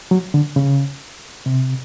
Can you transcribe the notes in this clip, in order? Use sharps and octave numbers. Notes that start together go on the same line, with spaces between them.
F#3
D3
C#3
C3